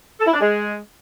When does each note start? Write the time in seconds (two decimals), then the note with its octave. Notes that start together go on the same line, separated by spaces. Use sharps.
0.19 A4
0.26 E4
0.34 D4
0.41 G#3